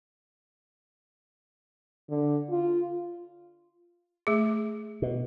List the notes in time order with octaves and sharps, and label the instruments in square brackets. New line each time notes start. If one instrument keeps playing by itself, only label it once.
[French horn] D3
F4
[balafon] A3 G#4
[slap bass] B2